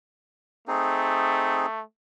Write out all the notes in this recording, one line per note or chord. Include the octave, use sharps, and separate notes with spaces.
A3 C4 D#4 G#4